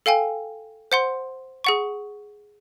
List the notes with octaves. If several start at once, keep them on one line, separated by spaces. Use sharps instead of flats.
A4 F5 G5 G#5
C5 F#5 C6
G#4 F#5 C#6